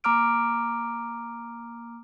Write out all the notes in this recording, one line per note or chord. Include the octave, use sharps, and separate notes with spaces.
A#3 A#5 D6 F6 D7